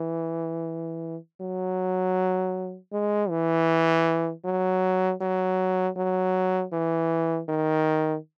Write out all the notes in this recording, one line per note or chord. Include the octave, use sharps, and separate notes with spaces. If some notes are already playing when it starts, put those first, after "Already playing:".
Already playing: E3
F#3
G#3
E3
F#3
F#3
F#3
E3
D#3